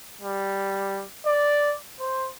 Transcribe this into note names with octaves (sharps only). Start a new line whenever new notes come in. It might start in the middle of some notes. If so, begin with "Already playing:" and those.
G3
D5
C5